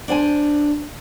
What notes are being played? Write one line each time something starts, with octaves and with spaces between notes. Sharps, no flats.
D4 C5 G5 G#5